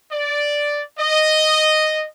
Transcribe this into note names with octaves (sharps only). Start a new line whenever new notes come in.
D5
D#5